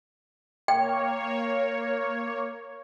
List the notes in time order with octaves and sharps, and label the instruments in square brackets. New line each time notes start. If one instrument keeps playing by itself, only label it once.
[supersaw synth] A#3 C#5 [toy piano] G5